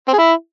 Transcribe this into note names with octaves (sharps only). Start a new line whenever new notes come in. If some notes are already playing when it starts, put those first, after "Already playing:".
C4
G#4
E4